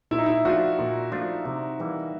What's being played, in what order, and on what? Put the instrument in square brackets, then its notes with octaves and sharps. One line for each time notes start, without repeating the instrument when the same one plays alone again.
[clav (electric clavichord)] A#2 [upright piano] E4
[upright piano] D#4
E4
[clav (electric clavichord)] F3 A3 D4 F4 [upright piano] F#4
[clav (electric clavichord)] A#2
F3 A3 D4 F4
C3
E3 G3 A#3